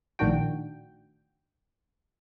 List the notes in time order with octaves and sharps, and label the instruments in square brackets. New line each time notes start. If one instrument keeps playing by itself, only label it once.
[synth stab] A#1 A2 D#3 D4 F#4 G5